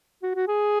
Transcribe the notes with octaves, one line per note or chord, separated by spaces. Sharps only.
F#4
F#4
G#4